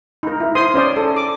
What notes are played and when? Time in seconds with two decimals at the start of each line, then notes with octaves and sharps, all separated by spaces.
0.23 D#4 A#4
0.40 E4
0.55 C5 C6 D#6
0.74 C#4 C5 D5 D#6
0.97 A4
1.16 D6